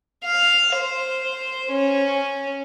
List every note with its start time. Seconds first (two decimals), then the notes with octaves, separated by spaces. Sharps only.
0.25 F5
0.76 C5
1.71 C#4